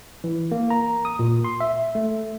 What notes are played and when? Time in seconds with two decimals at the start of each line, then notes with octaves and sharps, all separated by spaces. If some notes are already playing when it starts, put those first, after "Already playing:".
0.24 E3
0.52 A#3
0.70 A#5
1.05 D#6
1.19 A#2
1.44 C6
1.60 E5
1.95 A3